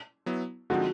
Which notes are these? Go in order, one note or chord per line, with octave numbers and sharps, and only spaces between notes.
F#3 B3 E4
D3 F3 G#3 C4 D#4 F#4